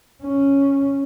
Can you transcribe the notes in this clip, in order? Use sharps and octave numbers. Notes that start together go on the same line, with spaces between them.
C#4